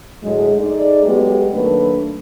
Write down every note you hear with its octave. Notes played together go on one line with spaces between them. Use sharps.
A2 D3 F#3 G#3
A3 D#4 G#4 D5
F#3 G#3 A3 B3 G4
D#3 F#3 A3 A#3 D4 B4